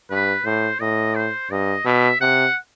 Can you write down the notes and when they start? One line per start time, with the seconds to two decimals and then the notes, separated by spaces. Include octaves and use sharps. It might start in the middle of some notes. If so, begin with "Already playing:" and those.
0.10 G2 B4
0.45 A2 C5
0.80 A2 D#5
1.15 C5
1.51 G2 D#5
1.85 B2 E5
2.21 C3 F#5